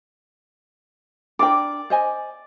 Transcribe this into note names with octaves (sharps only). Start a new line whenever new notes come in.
D4 A#4 D5 G5 D6
C5 D#5 G#5